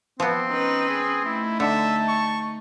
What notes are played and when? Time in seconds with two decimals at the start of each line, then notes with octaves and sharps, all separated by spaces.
0.20 F3 B3 C4
0.49 C#4 D#4 B4
0.89 G#4
1.25 A3 D#4 E4
1.60 D3 E5 A5
2.08 C#6